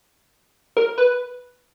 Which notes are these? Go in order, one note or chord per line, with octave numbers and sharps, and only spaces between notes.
A#4
B4